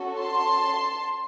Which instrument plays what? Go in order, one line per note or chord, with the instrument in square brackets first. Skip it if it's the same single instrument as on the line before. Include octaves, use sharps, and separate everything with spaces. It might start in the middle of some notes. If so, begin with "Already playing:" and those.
Already playing: [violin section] C#4 F#4 A4
A5 C6